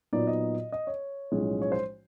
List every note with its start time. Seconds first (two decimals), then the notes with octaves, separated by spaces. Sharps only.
0.13 A#2 F#3 B3 D#4 D5
0.27 D#5
0.72 D#5
0.87 C#5
1.32 B1 A2 F3 G#3 C#4
1.62 C#5
1.72 C5